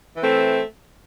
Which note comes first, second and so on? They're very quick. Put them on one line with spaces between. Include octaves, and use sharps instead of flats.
E3 A3 C4